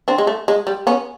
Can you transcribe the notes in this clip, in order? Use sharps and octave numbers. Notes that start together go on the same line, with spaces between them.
C4 D4
G#3
A3
G#3
G3
B3 C#4